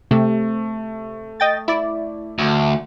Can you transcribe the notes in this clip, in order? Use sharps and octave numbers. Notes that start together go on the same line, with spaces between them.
C3 A3
D#5 G5 A6
E4 D5
D2